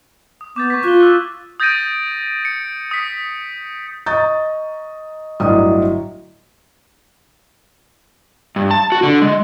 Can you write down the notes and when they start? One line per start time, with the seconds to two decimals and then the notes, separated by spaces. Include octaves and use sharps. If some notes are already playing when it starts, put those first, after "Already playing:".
0.41 D#6
0.56 B3 D6 G6 A6
0.70 C#6 G#6 B6
0.84 F4 F#6 G7
1.00 E6 F#6
1.60 D#6 G6 A6 A#6 D7 D#7
2.45 C#7
2.91 D#6 B6
4.06 D#5 A#5 C#6 D#6 G6 A6
5.40 G1 A2 F#3 D5 D#5 D#6
8.56 G2
8.71 A5
8.92 F#4
9.03 D3
9.22 G#3